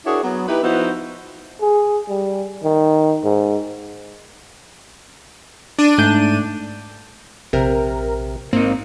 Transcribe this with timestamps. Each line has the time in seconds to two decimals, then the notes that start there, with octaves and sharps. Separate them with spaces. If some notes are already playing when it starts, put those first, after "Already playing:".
0.06 D4 E4 F#4 G#4 A#4 C#5
0.24 F#3 B3
0.48 D#4 E4 G4 B4
0.63 F3 B3 D#4 E4 F#4 C5
1.61 G#4
2.09 G3
2.64 D#3
3.24 G#2
5.79 D4 D#7
5.98 G#2 A3 G6
7.53 A#1 C3 A#4
8.53 G#2 A#3 C4 D#4